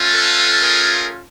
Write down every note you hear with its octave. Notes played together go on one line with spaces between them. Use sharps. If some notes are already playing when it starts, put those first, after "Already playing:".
Already playing: A3 C#4 F4
A4 B4
G#4 A#4